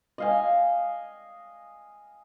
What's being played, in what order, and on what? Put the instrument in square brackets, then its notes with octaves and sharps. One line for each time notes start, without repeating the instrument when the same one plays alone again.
[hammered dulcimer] D#5 F5 G#5